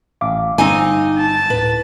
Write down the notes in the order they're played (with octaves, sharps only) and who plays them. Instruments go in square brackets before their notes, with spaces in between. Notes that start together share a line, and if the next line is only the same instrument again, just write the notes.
[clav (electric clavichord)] A1 E5 [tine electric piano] F5 D6
[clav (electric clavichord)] G1 [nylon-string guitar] C4 D#4 G#5
[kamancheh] A5
[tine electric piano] D2 A2 [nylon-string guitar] B4